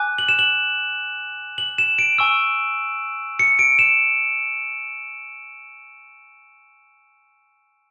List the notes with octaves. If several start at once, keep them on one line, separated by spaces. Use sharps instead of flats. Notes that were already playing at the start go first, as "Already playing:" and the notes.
Already playing: G#5 D6 F#6
F#7
E7
F#7
F#7
E7
D7
G#5 C#6 E6
C#7
D7
E7